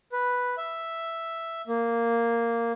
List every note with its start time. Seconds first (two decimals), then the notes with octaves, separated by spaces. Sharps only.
0.12 B4
0.58 E5
1.67 A#3